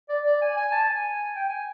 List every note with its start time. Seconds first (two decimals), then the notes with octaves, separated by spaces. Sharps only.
0.09 D5
0.26 D5
0.41 G#5
0.57 G#5
0.72 A5
0.89 G#5
1.35 G5
1.49 G#5